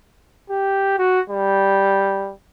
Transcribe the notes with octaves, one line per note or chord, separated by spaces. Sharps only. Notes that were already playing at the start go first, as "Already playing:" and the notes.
G4
F#4
G3